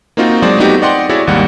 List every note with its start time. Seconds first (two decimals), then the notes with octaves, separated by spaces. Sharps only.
0.17 A#3 C4 D#4 F4 F#4
0.42 F#3 G#3 F#4 G#4 C5 D5
0.58 A3 B3 C4 D#4 F#4 G4
0.82 D5 D#5 F#5 G5 C6
1.09 E4 F#4 G#4 C#5 D5 E5
1.27 G#1 D#2 G3 F#5